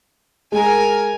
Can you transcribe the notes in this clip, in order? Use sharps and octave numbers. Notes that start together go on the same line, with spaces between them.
G#3 A#4 G#5